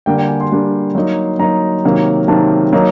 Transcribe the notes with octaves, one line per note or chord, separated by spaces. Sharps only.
D3 G3 A#3 D4 G5
G5
G#5
C6
D3 G3 A#3 D4
F#3 A#3 D#4
F#3 A#3 D#4 A#5
C3 D#3 F#3 A#3
C3 D#3 F#3 A#3 A5
F#3 A#3 D#4